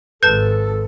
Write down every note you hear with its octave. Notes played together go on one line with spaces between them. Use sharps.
G#1 A4 B4 A5 G6